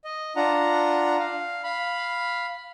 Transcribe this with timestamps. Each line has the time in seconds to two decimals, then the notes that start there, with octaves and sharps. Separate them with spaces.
0.04 D#5
0.36 D4 F4 F#5 A#5
1.19 F5
1.64 F5 B5